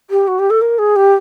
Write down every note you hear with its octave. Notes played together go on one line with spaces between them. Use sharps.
G4
F#4
G4
A4
A#4
G#4
G4